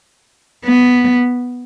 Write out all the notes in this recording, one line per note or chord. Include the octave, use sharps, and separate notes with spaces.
B3